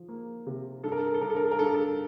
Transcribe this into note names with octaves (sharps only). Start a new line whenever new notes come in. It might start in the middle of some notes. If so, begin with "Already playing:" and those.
Already playing: F3
A#3
C3
G2 A4
A#4
A4
A#4
A4
G2 A#4
A4
A#4
A4
A#4
G2 A4
A#4
A4